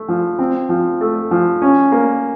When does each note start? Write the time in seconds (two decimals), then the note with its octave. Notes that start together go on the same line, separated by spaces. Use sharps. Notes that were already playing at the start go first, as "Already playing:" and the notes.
Already playing: A3
0.08 F3
0.39 C4
0.69 F3
1.01 A3
1.31 F3
1.62 C#4
1.92 A#3